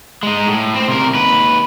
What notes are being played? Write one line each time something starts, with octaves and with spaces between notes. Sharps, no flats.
G#3 D#4
A2
C4 C5
C3 A#4
D#2 B4